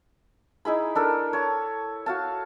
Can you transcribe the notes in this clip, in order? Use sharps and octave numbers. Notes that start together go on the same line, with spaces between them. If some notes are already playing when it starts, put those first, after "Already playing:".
D#4 E4 G#4 B5
D4 A4 A#4
C#5 A5
F#4 F5 A5